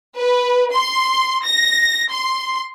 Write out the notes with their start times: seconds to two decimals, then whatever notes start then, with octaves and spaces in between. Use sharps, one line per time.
0.16 B4
0.74 C6
1.45 A#6
2.12 C6